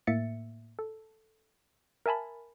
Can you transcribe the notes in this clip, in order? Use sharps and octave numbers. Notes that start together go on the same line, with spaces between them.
A2 A#3 E5 A6 C#7
A4
A#4 E5 G#5 A5 B5